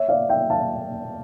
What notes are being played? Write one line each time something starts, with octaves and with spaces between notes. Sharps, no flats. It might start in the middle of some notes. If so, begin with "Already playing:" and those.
Already playing: C#5 E5
D5 F5
E5 G5
F5 A5